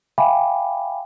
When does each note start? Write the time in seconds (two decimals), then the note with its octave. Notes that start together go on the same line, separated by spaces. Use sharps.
0.18 E5 F5 G5 G#5 B5 D6